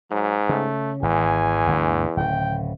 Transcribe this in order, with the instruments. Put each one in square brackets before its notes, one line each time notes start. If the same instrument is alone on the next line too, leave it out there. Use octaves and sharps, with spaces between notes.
[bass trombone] G#2 [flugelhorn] F#3
[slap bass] C#3 [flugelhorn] A3
[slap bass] G#1 [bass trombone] E2 [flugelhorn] G#5
[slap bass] G1 D2 D3
[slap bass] D1 C#3 [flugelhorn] G5